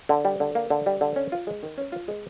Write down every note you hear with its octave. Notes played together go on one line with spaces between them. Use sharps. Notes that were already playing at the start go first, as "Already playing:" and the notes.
D3
G3
D3
A#3
D3
G3
D3
C#4
F4
G#3
D#3
C#4
F4
G#3